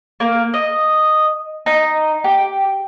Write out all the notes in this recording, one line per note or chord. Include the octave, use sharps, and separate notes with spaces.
A#3
D#5
D#4
G4